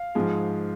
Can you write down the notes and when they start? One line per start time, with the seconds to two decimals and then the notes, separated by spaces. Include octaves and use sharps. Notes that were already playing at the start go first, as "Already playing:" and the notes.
Already playing: F5
0.15 G#2 F3 G#3